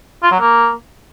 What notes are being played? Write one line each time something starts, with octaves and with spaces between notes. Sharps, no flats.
F4
F#3
A#3